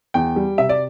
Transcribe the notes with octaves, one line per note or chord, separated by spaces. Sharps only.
E2 G5
G3
C3 E5
D5